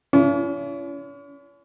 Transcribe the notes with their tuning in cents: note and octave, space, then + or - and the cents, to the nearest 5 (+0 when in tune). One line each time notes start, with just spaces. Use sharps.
C#4 +45 E4 +45